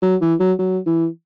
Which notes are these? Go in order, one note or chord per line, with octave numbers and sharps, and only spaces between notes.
F#3
E3
F#3
F#3
E3